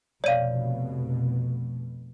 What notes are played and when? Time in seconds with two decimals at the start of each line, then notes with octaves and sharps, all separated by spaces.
0.24 F1 B2 C#5 D5 F5 D#7